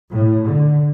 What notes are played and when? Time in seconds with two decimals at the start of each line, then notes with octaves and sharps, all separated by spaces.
0.11 A2
0.47 D3